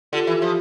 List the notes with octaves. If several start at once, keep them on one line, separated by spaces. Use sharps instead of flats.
D3 F4 G4
E3
F3